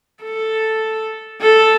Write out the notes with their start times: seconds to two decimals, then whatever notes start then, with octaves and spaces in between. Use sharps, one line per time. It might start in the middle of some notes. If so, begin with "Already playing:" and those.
0.24 A4
1.41 A4